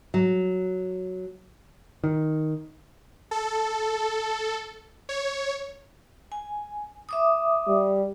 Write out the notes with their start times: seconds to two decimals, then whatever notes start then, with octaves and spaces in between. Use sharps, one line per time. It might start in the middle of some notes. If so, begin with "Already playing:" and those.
0.14 F#3
2.04 D#3
3.31 A4
5.09 C#5
6.32 G#5
7.09 E5 D6 D#6
7.67 G3